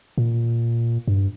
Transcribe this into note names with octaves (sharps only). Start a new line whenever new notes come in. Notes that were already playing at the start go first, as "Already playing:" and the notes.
A#2
G2